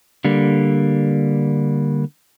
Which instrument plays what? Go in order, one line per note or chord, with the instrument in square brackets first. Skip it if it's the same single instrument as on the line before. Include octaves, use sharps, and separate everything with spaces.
[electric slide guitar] D3 G3 A#3